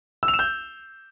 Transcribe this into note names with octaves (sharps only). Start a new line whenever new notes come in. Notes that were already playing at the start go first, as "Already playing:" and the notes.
E6
F7
E7
G6